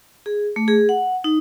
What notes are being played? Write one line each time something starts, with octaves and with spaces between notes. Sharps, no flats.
G#4
A3
G#4
F#5
D#4